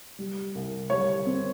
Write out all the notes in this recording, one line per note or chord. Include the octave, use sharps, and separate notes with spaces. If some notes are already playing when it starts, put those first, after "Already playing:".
G3
C2
G3 C#5
C4